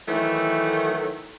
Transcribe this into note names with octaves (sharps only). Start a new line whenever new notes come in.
D#3 E3 F#3 A3